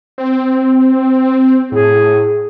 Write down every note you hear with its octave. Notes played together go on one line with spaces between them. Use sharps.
C4
A2 G#4